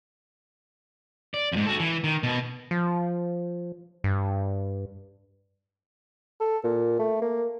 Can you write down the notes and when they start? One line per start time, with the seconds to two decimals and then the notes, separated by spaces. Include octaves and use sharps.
1.34 D5
1.53 F2 G#2
1.66 F#4 A4
1.80 E3
2.04 D#3
2.23 B2 B3
2.71 F3
4.04 G2
6.40 A4
6.64 A#2
6.99 A3
7.22 A#3